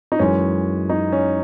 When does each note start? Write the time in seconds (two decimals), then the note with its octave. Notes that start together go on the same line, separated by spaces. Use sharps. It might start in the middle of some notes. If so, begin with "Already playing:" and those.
0.12 D#4
0.19 F#2 E3 G#3 C#4
0.89 D#4
1.12 C#4